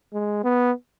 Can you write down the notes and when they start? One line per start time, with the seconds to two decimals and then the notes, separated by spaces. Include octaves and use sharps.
0.13 G#3
0.44 B3